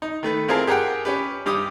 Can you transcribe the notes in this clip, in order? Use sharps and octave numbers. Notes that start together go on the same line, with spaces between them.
D#4
D#3 A3 B4
C4 E4 F4 G#4 A#4 A5
G4 G#4 A#4 F#5 G5
C#4 G4 B4
G2 G4 D6 D#6